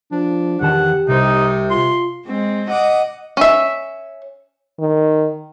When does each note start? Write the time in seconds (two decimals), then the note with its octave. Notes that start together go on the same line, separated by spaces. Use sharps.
0.12 F3 D4
0.61 E2 D#3 G4 F#5 A5
1.08 C2 C3 D#4 C5
1.70 F4 C6
2.26 G#3 C4
2.68 D#5 F#5 D6 D#6
3.37 C#4 E5
4.79 D#3